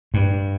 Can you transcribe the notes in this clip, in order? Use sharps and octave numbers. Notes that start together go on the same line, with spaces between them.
G2